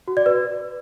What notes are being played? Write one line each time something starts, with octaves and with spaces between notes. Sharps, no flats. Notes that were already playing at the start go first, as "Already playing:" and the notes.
F#4
D5
B4